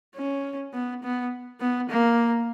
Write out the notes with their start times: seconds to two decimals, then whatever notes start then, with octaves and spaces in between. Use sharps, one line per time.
0.16 C#4
0.73 B3
1.04 B3
1.61 B3
1.90 A#3